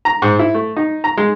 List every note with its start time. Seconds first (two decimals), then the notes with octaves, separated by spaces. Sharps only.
0.05 A#5
0.22 G#2
0.39 E4
0.54 A3
0.77 D#4
1.04 A#5
1.18 G#3